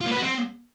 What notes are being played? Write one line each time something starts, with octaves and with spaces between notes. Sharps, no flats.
F4
A#3
B4
F#4
C4